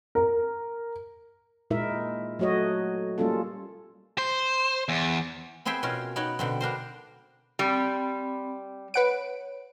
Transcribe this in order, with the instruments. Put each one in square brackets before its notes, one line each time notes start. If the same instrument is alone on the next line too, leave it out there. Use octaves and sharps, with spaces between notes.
[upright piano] A#4
[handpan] A#2 G#3 D#4 E4 A#4 E5
F#3 A3 F#4 C#5 D#5
G3 A#3 C#4 F4 A4
[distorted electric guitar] C5
E2
[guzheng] B3 C4 G#4 C5 E5 G5
B2 C#4 F4 A#4
B3 D#4 C#5 F#5 G5
B2 D3 C4
B3 D4 A#4 C5
[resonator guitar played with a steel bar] G3 [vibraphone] C4 B5
[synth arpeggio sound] B4 F#5 D7 [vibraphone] C#5